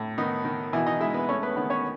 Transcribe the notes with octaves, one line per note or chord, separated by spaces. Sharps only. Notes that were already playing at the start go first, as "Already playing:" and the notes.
Already playing: A2
D#3 B3 D#4
D#3
B2 E3 E4
D#4 D#5
G#3 E4 E5
B3 B4
A3 C#4 C#5
B3 B4
D#3 B3 B4
C#4 C#5